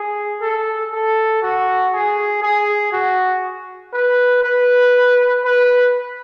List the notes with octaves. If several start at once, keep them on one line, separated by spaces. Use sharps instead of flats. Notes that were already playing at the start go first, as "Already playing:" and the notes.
Already playing: G#4
A4
A4
F#4
G#4
G#4
F#4
B4
B4
B4